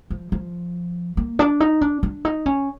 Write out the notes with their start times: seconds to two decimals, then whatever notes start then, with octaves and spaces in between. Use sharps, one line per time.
0.10 F3
0.32 F3
1.17 A#3
1.39 D4
1.60 D#4
1.81 D4
2.03 D4
2.25 D#4
2.46 C#4